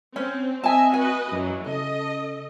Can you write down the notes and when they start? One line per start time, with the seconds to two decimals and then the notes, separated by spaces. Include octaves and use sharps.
0.16 C4 C#4
0.64 C4 D#5 E5 G#5 A5
0.94 F#4 B4 D#5 G#5
1.32 F#2 E3 F#3
1.67 C#3 A4 D#5